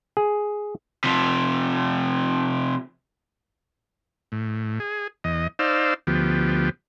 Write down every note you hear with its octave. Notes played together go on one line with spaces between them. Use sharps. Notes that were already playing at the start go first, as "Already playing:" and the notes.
G#4
C3 F3
A2
G#4
E2 D#5
D#4 C5 D5 F5 E6
D2 F3 B3 G4